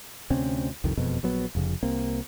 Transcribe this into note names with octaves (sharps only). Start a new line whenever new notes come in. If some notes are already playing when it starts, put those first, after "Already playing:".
D2 C3 C4 C#4
C2 F2 D#3
E1 F2 B2
A#1 F#3 B3
F1 F2 C#3
C2 A#3 C4